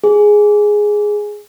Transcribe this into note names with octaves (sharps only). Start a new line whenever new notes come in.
G#4